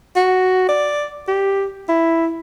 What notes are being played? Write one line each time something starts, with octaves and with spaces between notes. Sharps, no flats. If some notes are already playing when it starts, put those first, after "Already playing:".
F#4
D5
G4
E4